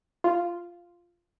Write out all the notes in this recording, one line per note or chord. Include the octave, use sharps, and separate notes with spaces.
F4